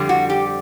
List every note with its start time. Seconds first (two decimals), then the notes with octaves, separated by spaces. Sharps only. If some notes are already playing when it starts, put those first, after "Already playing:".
Already playing: F2 D3 G3
0.09 F#4
0.30 G4